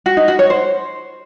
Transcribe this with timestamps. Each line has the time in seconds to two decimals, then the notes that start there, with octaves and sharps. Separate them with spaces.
0.06 F#4
0.17 D#4
0.28 F#4
0.39 C#5
0.50 C5